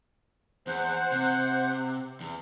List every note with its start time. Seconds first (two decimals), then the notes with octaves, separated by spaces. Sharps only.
0.67 E2 C5 F#5
1.12 C3
2.21 E2